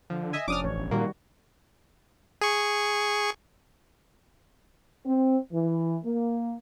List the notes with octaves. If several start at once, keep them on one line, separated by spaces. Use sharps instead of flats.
D3 F3
D#5 E5 G#5
F1 F3 C#4 D4 D6 D#6 F6
A1 C#5
G1
A#2 D#3 G3 A#3 F#4
G#4 C#6
C4
E3
A#3